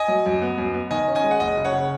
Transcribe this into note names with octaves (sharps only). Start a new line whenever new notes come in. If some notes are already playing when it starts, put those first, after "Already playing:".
Already playing: D#5 G#5
F#3
F#2
B3
F#2
B3
D#3 D#5 G#5
C#4
D#5 G#5
G#3
F#5
F#1 D#5
C#3
C#5 F#5
C#3